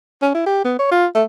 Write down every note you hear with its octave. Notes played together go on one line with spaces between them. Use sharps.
C#4
E4
G4
B3
C#5
F4
A3